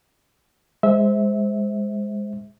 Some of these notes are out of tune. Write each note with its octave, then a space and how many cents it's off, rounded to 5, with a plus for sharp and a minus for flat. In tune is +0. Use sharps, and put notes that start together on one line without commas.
G#3 -10 C5 +0 E5 -25